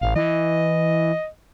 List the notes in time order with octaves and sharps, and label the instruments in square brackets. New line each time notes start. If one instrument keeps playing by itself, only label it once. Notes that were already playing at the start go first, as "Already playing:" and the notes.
[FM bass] A1 [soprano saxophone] F5
[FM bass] E3 [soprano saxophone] D#5